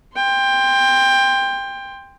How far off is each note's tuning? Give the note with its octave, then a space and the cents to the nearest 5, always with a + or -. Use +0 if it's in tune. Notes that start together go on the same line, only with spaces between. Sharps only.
G5 +20 C6 +0